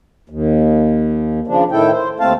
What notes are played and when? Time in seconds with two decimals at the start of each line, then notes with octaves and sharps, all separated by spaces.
0.30 D#2
1.47 C#3 F3 D4
1.72 A2 D#3 E4 A4 G5
1.91 C5
2.20 D#2 A3 C4 F5 A5